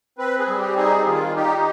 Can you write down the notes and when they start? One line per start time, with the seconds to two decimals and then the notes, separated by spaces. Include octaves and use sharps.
0.18 C4 B4
0.39 G#4
0.48 G3
0.57 G4
0.77 D#4 G#4
1.06 D#3 F4
1.35 D#4 G4